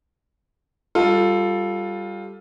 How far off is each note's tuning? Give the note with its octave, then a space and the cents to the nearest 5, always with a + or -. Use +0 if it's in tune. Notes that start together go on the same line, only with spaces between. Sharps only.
G3 +0 F4 +15 A4 +0